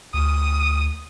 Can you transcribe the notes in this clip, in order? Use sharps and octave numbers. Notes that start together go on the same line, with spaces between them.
D2 D#6